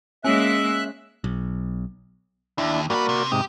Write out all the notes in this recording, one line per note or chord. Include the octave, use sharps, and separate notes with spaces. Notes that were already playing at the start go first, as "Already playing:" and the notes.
G#3 A#3 C#4 E5 F#6
B1
D#2 D4 E4
G2 A#3 F#4 B4 D5
C3
G#2 C3 G4 D#6